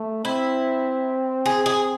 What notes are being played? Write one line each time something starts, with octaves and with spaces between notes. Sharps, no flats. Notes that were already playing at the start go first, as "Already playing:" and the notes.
Already playing: A3
C4 E4
G#4
G#4